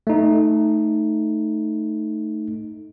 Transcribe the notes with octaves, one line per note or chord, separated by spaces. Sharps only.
A3 D#4